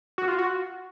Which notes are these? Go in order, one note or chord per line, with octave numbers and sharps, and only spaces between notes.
F#4
F4
F#4